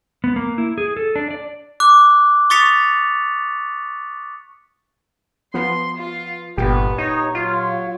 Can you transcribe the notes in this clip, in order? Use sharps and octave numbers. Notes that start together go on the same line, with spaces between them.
B3
A#3
E4
G#4
A4
D4
D5
D6 F#6
C#6 D#6 A6 B6 C#7 F7
F3 B3 C6
F4
G1 A#2 B3 G4
D#4 C#5
F#3 F4